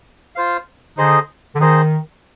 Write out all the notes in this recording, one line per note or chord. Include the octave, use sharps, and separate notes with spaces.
F4 C5 F5
D3 D#4 G#4 C5 D#5
D3
D#3 D#4 G#4 C5 D#5